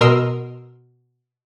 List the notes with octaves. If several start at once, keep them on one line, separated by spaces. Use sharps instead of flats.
B2 A#4 D#5 C6 E6